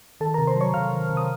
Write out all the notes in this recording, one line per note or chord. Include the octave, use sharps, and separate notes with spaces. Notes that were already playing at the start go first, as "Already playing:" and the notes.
D#3 A4 A5
C3 A#4 A#5
C5 C6
F#3 C#5 C#6
C3 F5 F6
D#3
C3
D#6